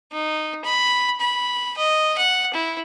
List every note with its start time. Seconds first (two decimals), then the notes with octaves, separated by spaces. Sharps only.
0.12 D#4
0.65 B5
1.21 B5
1.77 D#5
2.18 F#5
2.53 E4